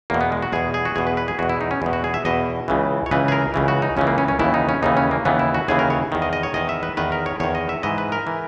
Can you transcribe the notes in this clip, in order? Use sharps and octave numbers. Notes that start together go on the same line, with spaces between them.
E2 B2 A#3
B3
G#3
F#4
E2 B2 G#4
G#4
F#4
E2 B2 G#4
B4
B4
G#4
E2 B2 F#4
E4
D#4
C#4
E2 B2
F#4
G#4
E5
E2 B2 D#5
C#2 C#3 E3
C#5
C#2 C#3 E3 B4
G#4
A#4
C#2 C#3 E3
F#4
D#4
C#2 C#3 E3 C#4
A#3
C#4
C#4
D#2 C#3 E3 E4
D#4
C#4
D#2 C#3 E3 D#4
C#4
A#3
D#2 C#3 E3 B3
E4
F#4
D#2 C#3 E3 G#4
A#4
C#5
E2 D#3
D#5
D#5
C#5
E2 D#3 D#5
E5
B4
E2 D#3 B4
A#4
C#5
E2 D#3 C#5
D#5
E5
G#2 E3 D#5
B4
A#4
E3